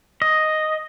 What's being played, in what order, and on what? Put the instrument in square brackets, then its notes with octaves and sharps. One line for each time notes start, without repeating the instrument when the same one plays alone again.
[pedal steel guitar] D#5